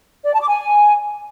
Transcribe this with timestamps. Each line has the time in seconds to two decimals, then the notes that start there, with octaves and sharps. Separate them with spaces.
0.24 D5
0.32 A5
0.41 D6
0.49 G#5